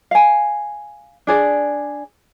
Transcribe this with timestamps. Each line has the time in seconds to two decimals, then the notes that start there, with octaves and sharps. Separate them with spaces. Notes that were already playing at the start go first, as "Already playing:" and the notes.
0.11 F5 G#5
1.27 D4 G#4 D5